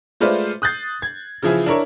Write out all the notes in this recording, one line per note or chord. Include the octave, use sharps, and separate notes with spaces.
G#3 A3 F4 B4 C5 D5
D#6 F#6 G6 A6 C7
G#6
C#3 E3 F3 E4 F4 G#4
D4 E4 A#4 C#5